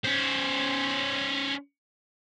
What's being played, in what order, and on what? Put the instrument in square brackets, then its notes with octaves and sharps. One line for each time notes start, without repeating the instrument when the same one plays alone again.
[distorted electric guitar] C#4 C5